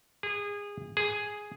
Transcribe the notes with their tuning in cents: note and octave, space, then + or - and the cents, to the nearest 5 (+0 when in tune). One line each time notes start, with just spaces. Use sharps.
G#4 -25
G#4 +0